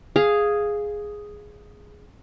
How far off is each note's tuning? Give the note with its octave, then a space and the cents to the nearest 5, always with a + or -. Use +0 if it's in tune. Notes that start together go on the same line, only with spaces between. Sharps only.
G#4 +0 F5 +0